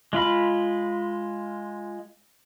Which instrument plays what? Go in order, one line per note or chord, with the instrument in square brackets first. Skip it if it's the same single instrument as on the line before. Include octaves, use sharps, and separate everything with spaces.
[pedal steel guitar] G#3 F4 B5